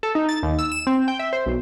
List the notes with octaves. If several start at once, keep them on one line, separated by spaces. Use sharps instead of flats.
A4
D#4
A6
D#2
E6
E7
C4
G5
E5
C5
B1